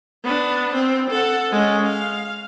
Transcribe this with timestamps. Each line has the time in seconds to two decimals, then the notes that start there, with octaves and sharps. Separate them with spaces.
0.24 B3 D4
0.74 C4
1.11 A4 F#5
1.51 G#3 C#4
1.85 F5